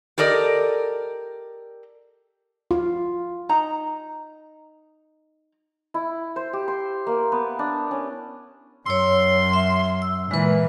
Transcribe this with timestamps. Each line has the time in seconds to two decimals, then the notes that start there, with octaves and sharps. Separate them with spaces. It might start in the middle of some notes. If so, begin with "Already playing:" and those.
0.18 G4 A4 A#4 D5 D#5
2.71 F4
3.49 D#4 A#5
5.94 E4
6.36 C5
6.53 G4
6.68 C6
7.07 A#3
7.32 B3
7.59 D4
7.91 C#4
8.86 F#2 C#5 C6 E6
9.53 E5
10.02 E6
10.31 A#2 E3 G#3 B4